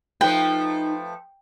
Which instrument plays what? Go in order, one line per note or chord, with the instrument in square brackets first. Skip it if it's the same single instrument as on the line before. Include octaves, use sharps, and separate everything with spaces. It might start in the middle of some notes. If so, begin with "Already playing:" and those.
[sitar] F3 A3 B4 [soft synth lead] D#4 [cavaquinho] G5